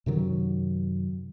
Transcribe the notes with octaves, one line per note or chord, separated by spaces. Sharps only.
F#2 C3 D#3 F#3